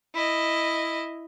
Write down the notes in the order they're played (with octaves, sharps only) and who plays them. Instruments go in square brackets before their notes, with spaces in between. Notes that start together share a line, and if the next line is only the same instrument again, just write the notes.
[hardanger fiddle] E4 D#5